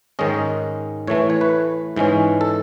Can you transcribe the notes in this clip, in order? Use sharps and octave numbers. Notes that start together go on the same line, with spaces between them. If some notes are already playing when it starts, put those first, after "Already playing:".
G#2 D#3 G#3 C#4 D#5
A2 E3 A3 C#5
C#5
B4
G#2 E3 G#3 C#4
A4